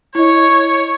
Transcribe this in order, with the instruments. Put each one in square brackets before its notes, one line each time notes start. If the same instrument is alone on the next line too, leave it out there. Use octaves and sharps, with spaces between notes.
[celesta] E4 D#5 [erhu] C#5